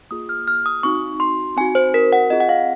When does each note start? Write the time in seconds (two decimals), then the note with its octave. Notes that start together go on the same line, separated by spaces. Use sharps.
0.11 A#3 F4 G#4 D#6
0.29 F6
0.48 F6
0.66 D#6
0.83 C4 D#4 F#4 C#6
1.20 C6
1.56 C4 D#4 F#4 G#5
1.75 C5
1.94 A#4
2.12 F#5
2.30 C4 F4 G#4 D#5
2.40 F#5
2.49 F5